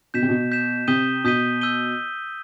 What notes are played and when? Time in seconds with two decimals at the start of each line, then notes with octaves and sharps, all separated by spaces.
0.14 B2 G6 B6 E7
0.22 C3
0.29 B2
0.52 G6 B6 E7
0.87 C3 D#6 G6 B6 D#7 G7
1.24 B2 D#6 G6 B6 D#7 G7
1.61 E6 G6 D#7 G7